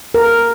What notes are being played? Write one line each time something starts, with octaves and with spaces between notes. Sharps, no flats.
A#4